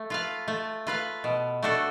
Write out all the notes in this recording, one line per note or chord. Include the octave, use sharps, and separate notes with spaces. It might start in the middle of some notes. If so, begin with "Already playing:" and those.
Already playing: A3
F4 B4 F5
A3
F4 B4 F5
B2
A3 D4 F#4 A4